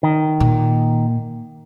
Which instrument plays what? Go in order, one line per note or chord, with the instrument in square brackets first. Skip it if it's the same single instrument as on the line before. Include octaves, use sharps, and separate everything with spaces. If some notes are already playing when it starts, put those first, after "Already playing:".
[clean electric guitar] D#3
[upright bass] A#2